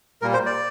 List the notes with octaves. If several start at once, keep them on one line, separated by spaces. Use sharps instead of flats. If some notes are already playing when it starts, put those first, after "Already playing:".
A#2 G3 A#3 A#4
C5
D5